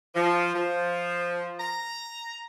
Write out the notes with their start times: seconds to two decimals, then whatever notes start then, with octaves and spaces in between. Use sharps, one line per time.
0.14 F3
0.54 F3
1.59 A#5